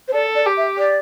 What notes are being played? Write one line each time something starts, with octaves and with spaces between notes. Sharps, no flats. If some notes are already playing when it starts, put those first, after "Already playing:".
C5
A4 D5
D5
G4
E5
D5